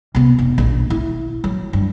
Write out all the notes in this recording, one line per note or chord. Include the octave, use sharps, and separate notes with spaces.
C3 B3
F1
A#1 C#3
E4
F#3
G2